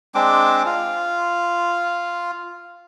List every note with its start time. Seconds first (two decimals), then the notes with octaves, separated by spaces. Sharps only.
0.15 G#3 C4 D4 D6
0.66 F4